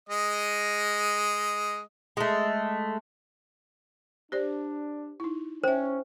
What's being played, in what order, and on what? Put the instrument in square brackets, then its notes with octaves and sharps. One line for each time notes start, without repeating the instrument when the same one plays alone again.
[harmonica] G#3 D#5
[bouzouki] G#3 A3
[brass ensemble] D4 [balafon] G4 C5 D5
[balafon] D#4 E4
[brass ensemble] C#4 [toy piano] C5 [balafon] E5 G5